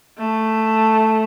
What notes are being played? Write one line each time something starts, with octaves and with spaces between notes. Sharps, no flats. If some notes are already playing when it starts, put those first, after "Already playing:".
A3